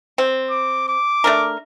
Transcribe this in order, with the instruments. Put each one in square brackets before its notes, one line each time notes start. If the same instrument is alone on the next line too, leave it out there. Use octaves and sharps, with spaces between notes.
[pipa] C4
[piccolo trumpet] D6
D6
[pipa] A3 D4 A#4